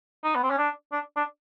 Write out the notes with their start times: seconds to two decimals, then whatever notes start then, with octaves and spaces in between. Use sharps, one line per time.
0.24 D#4
0.35 B3
0.43 C4
0.51 C#4
0.58 D4
0.92 D4
1.16 D4